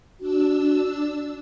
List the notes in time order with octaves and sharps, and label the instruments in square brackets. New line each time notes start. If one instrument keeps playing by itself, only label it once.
[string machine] D4 E6 [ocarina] F#4